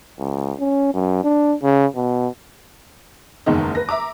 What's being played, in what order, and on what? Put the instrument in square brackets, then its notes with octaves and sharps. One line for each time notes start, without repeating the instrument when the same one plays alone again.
[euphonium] C#2
C#4
F#2
D4
C#3
B2
[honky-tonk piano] F#1 E2 D#3 G#3 D#4
B4 A#6
E5 A#5 D6